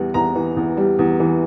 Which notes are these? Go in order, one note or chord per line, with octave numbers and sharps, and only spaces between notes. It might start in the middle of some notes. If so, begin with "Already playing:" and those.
Already playing: E2 E3 G3
E2 A#5
E3
E2
G3
E2
E3